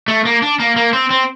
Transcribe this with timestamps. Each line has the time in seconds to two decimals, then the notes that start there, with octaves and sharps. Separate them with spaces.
0.08 A3
0.25 A#3
0.42 D4
0.60 A#3
0.76 A#3
0.93 C4
1.10 C4